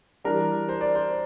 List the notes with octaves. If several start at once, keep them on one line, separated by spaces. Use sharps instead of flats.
E3 G3 D4 A#4
C5
D5
C5